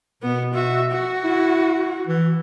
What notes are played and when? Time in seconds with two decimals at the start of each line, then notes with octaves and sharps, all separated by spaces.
0.22 B2 B3
0.54 F#4 E5
0.92 F#4
1.24 E4
2.07 E3